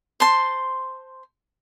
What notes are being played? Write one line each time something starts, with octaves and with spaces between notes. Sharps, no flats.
C5 A5 C6